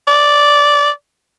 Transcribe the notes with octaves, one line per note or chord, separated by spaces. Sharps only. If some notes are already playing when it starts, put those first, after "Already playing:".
D5